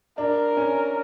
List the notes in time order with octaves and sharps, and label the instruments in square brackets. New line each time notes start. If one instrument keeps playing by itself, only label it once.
[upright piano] D4 [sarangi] A#4
[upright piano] C#4